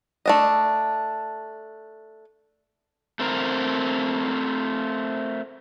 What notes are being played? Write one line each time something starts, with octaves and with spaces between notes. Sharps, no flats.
A3 D4 D#5
A3 C4 A#4